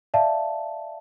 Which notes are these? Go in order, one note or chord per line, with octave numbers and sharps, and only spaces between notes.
D5 E5 F5 A5